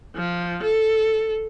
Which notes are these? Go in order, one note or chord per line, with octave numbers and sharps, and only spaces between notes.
F3
A4